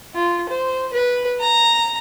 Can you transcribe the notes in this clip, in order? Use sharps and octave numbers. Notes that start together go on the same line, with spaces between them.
F4
C5
B4
A#5